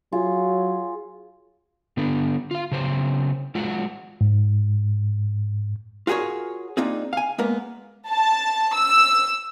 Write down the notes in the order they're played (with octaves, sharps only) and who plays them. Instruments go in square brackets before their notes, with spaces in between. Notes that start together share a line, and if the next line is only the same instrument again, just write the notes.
[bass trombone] F#3 [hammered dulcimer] F4 G#4
[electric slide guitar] D3 B3 D4 A4
F4 F5
C#3 F#3 C5
G#3 F4 F#4 F#5
[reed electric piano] G#2
[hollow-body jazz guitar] F4 F#4 G#4 A#4 C#5
A#3 C4 D4 D#4 F4 G#4
F5 G#5
G#3 A#3 B3 A#4
[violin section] A5
E6